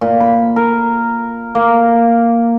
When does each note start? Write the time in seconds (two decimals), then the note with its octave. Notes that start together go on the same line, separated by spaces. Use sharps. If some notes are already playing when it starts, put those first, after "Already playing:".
0.01 A#2
0.20 B5
0.56 A#4
1.55 A#3